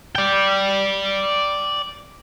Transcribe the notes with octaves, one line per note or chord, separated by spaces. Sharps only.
D5 G5